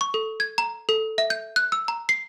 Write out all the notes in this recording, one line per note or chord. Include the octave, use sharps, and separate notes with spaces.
C#6
A4
G#6
A#5
A4
E5
G6
F#6
E6
A#5
C7